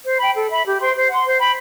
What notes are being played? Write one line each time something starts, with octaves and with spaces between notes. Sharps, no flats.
C5
G5 B5
A4
E5 B5
G4
C5 G5 C6
C5
F#5 C6
C5
G5 B5